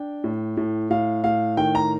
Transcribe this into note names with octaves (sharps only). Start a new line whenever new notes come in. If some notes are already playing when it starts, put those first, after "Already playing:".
Already playing: D4 G5
A2
A2
A2 F5
A2 F5
D#3 G5
A#5